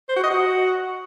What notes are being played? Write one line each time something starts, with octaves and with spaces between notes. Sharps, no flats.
C5
F#4
D#5
F#4